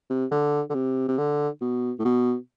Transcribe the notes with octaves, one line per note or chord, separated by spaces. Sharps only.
C3
D3
D3
C3
C3
D3
B2
A2
B2